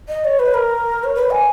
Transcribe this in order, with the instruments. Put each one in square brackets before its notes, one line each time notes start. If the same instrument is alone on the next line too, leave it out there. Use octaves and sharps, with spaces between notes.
[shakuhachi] D#5
C#5
B4
A#4
C#5
B4
G#5